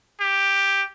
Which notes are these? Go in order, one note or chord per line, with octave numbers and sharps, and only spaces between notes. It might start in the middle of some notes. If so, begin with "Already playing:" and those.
G4